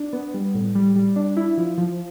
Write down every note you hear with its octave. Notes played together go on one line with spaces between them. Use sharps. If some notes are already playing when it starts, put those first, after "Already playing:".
Already playing: D4
B3
G3
A2
G3
G3
D4
E4
F3
F3